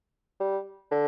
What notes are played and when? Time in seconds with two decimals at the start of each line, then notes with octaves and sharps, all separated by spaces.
0.40 G3
0.91 D3